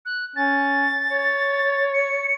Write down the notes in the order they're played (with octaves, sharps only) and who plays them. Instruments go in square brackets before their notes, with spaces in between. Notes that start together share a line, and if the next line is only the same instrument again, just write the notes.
[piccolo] F#6
[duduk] C#4 [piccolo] A6
[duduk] C#5
[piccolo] C#7